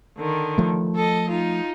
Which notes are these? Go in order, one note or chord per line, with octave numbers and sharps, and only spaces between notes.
D3 D#3
F3 A3
A4 D#5
D#4 F4